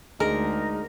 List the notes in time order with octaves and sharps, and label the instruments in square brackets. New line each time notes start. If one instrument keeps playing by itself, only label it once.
[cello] D2 [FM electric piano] G#3 [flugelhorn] D#4 [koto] A#4